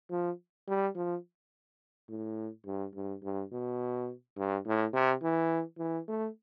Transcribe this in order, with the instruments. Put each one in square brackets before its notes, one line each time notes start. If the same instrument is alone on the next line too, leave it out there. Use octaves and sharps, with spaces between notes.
[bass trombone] F3
G3
F3
A2
G2
G2
G2
B2
G2
A2
C3
E3
E3
A3